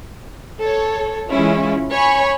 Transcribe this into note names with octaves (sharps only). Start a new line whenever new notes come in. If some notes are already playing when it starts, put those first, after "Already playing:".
A4 C#5
E3 G#3 C#4 E4 F4
C#5 G#5 B5 C#6